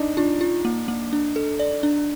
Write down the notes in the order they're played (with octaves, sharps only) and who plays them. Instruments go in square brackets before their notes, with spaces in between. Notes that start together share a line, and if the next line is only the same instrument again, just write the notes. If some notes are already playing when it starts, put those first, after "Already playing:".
Already playing: [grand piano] D4 D#4
[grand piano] D4 [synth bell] F4
[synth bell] F4
A#3
A#3
D4
A4
D5
D4